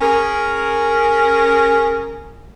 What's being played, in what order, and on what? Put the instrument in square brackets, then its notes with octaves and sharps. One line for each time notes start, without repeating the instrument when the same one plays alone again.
[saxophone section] C#4 G#4 A#4